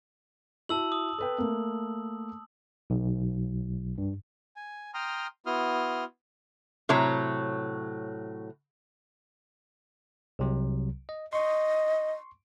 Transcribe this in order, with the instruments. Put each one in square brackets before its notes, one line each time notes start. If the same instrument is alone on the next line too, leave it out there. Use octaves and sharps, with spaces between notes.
[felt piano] E4 F#4 [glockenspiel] A5 E6 F#7
[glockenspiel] D#6
[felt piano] A4 B4 G5
A3 A#3
[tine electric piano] B1
G2
[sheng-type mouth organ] G#5
G5 A#5 C6 D#6 F6
B3 E4 F#4 C6 D#6 F6
[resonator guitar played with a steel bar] A2 C3 F#3 C#5 A#5
[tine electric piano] C2 C3 F#3
D#5
[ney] D#5 [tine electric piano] C6 C#6